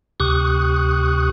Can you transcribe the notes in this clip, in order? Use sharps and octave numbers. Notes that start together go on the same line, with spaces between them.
D2 C3 G4 C#6 D#6 F#6